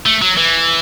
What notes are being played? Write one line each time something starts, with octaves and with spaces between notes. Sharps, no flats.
A3
F#3
E3